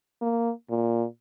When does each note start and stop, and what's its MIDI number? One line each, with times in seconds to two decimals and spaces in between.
0.22 0.51 58
0.70 1.05 46